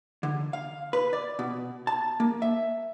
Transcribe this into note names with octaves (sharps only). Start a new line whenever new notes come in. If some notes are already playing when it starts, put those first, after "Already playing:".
D3
F5
B4
D5
B2
A5
A#3
E5